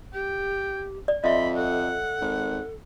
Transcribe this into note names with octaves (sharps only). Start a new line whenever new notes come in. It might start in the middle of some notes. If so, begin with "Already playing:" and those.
G4 G5
D5
F2 D#5 E5 B5 C6
A4 F#5
G#1